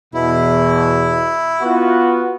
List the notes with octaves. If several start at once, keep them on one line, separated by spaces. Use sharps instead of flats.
E2 B2 E4
B3 F4 F#4